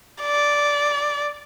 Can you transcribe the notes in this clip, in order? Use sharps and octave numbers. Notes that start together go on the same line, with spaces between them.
D5